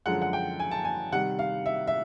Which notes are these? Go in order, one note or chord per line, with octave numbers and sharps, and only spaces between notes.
F#2 D3 F3 G#3 F#5
F#5
G5
G#5
A5
G#5
C3 D#3 G3 F#5
F5
E5
E5